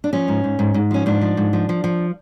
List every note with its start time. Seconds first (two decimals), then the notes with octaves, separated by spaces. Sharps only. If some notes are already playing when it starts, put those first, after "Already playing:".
0.04 D4
0.13 F3 C#4
0.28 G#2
0.44 G#2
0.59 G#2
0.74 G#2
0.91 F3 C#4
1.06 G#2 D4
1.21 F3
1.37 G#2
1.53 F3
1.69 F3
1.84 F3